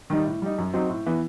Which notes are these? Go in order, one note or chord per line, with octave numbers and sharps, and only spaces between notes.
D#3 G3 D#4
A2
G3 D#4
F#2
F#3 C4 D#4
A2
E3 B3